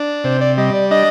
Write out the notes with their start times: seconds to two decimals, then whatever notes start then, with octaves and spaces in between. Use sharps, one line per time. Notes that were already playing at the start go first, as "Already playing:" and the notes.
Already playing: D4
0.24 C3 C5
0.41 D5
0.58 G3 D#5
0.74 D5
0.91 D4 D#5